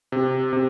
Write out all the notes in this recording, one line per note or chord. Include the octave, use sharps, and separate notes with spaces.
C3
C3